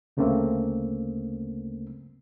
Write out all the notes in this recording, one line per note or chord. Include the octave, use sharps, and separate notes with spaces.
D2 C#3 A3 A#3 C4